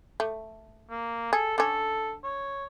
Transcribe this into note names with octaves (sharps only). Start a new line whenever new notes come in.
A3
A#3
G#4 A4
D3 C#4 A4
C#5